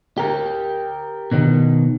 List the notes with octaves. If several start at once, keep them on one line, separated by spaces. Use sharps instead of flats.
G4 A#4
B2 D#3